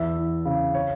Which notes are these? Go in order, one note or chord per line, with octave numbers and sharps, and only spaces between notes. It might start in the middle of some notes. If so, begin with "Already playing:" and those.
Already playing: E2 E5
E3
C#3
C#5